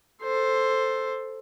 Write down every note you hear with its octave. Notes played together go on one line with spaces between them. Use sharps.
A4 C5